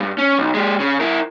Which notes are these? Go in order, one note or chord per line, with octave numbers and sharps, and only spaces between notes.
G2
C#4
B1
G#3 G4
C#3
E4 A#4